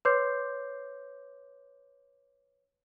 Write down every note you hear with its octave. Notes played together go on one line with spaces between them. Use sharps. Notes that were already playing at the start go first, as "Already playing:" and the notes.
B4 C#5 C6 D6 G6 C7